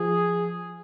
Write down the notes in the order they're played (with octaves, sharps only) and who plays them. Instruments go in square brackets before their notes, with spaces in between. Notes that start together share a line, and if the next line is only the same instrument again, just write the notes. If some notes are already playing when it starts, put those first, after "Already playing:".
Already playing: [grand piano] F3 [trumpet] G#4